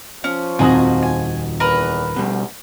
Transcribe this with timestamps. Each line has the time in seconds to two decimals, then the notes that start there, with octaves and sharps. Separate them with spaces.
0.24 F3 C#4
0.59 D#1 F2 C4 D#4 F#4 G#5 A#5 D#6
1.03 G#5
1.60 E2 A#4 B4
2.16 D2 B2 G3